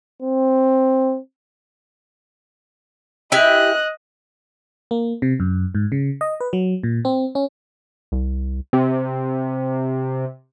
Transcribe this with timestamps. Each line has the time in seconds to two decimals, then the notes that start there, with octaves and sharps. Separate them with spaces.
0.22 C4
3.32 E4 G4 D#5 G#5 F#6
4.91 A#3
5.22 C3
5.40 F#2
5.75 G#2
5.92 C#3
6.21 D#5
6.40 B4
6.53 F#3
6.83 A#2
7.05 C4
7.35 C#4
8.12 C2
8.73 C3 C4